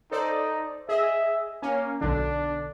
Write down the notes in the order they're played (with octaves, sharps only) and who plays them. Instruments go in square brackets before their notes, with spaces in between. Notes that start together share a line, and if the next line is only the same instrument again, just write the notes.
[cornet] D#4 [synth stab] A4 C5 D5
[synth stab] G#4 D#5 [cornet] E5
[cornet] A#3 [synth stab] C#4
[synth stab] B1 D3 [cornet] D4